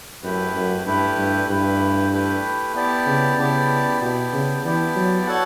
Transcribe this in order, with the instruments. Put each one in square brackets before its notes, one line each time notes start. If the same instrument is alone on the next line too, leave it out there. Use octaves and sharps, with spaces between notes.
[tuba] F#2 [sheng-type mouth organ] A3 E4 G4 B4
[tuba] F#2
[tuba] G2 [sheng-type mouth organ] A3 E4 G4 B4
[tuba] G2
[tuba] G2 [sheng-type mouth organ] A3 E4 G4 B4
[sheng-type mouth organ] A3 E4 G4 B4
B3 E4 G4 D5 A5
[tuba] C#3
[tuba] C#3 [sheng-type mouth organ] B3 E4 G4 D5 A5
[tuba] B2 [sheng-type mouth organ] B3 E4 G4 D5 A5
[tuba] C#3
[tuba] E3 [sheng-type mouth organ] B3 E4 G4 D5 A5
[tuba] F#3
[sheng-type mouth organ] F#4 A4 C#5 F#5 A5